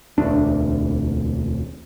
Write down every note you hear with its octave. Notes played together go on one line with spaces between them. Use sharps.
E1 D2 D4